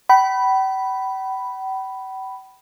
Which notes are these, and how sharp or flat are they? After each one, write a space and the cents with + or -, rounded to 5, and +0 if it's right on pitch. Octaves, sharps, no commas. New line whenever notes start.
G5 -45 B5 +0